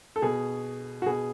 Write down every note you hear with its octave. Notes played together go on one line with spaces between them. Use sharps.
A4
B2 G#4
F#4
B2 G#4